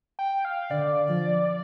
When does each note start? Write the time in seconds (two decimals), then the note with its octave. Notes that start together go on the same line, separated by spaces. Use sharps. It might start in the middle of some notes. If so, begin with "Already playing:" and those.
0.19 G5
0.45 F5
0.70 D3 D5
1.09 F3